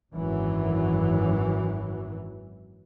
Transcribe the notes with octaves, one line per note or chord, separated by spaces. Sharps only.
G#1 F#2 E3 F#3